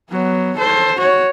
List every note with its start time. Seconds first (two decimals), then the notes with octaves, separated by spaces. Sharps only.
0.10 F#3 B3
0.57 A4 C5
0.98 F#4 C#5